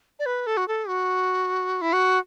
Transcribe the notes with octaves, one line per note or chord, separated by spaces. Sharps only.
D5
B4
A4
F#4
A4
F#4
E4
F#4